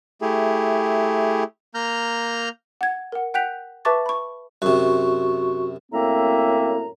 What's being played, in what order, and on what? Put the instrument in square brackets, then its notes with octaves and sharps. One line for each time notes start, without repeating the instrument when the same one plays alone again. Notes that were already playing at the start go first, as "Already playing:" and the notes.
[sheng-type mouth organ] A3 E4 G4 G#4
A#3 A#5 F6 G6
[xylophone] F#5 G#6
A#4 F#5
F#5 G5 F#6 G6 B6 F7
B4 E5 A5 C#6 D6 A6
B5 C#6
[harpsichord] F#2 C3 [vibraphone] F#4 C#6
[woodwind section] F#2 A2 A#3 C4 E5 A#5